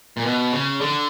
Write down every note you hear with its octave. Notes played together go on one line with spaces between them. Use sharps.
A#2
B2
C#3
D3